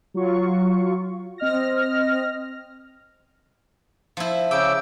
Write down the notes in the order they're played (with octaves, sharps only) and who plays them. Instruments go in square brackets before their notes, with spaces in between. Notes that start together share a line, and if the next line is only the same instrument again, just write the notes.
[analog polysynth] F#3 F4 C#6
C4 D#5 F6 A#6
[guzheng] F3 E4
[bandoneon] C#3 D6 E6 [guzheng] G5